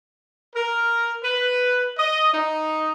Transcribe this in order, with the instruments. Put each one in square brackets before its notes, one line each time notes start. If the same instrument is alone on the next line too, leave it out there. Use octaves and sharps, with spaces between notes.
[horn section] A#4
B4
D#5
D#4